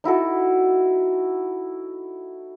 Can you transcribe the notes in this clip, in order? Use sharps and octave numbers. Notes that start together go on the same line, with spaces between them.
D#4 E4 F#4 A4